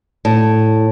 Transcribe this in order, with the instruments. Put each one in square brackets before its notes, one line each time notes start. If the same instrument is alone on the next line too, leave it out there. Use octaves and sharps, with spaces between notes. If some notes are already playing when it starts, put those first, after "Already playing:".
[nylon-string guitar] A2